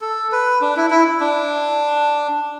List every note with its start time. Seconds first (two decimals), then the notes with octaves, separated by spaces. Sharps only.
0.01 A4
0.32 B4
0.61 D4
0.77 E4
0.90 E4
1.20 D4